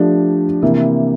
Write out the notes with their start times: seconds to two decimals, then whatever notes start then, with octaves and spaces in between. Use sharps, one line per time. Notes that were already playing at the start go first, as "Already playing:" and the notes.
Already playing: F3 A3 D4 G4 D5
0.62 C3 E3 A#3 E4